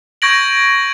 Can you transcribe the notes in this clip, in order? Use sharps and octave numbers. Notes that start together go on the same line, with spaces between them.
C#6 G6 G#6 A#6 D7 F#7